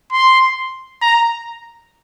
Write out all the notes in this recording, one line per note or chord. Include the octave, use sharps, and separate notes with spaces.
C6
A#5